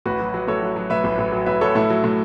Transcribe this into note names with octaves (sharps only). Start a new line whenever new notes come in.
A1 F#4 B4
F#3
F#3
A2 A4 C#5
F#3
F#3
A2 B4 E5
A1
A1
F#3
A1 B4 E5
F#3 A4 C#5
A2 E4 A4
F#3
A2